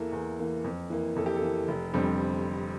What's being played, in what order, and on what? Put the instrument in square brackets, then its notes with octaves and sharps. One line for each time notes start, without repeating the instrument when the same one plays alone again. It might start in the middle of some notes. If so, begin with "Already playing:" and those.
Already playing: [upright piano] E2 E3 A#3 A4
E2
E3 A#3
F2
E3 A#3
F2 A4
G4
A4
E3 A#3
F1
F2 D3 G3 C4